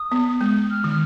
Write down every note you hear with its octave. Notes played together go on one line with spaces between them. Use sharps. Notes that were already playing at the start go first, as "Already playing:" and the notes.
Already playing: D#6
B3
G#3
F6
D#3
F6